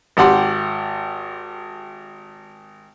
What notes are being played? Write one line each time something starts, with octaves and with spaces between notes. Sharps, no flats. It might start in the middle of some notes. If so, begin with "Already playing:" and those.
G#1 G4 F#5 C6